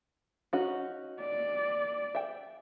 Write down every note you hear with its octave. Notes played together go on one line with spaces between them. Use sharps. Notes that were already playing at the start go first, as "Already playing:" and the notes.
C#4 D#4 F#4
D5
E5 G5